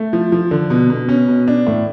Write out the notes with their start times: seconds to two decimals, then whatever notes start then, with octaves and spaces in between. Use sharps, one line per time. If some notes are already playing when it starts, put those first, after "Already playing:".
Already playing: A3
0.13 F3
0.32 F3
0.51 D3
0.70 B2
0.90 B2
1.09 C#4
1.28 B2
1.48 D4
1.67 A2